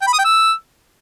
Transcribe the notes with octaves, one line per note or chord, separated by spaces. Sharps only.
G5
B5
D#6
G5
E6